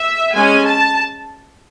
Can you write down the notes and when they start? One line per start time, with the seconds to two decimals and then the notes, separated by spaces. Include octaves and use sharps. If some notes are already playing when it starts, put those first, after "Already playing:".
Already playing: E5
0.34 G#3 C#4 G#5
0.66 A5